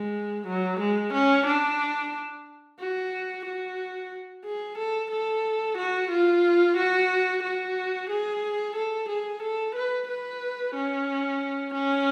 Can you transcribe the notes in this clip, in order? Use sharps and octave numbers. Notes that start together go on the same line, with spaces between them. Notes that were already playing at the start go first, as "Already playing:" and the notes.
Already playing: G#3
F#3
G#3
C#4
D4
F#4
F#4
G#4
A4
A4
F#4
F4
F#4
F#4
G#4
A4
G#4
A4
B4
B4
C#4
C#4